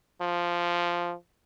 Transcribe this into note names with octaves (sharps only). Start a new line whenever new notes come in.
F3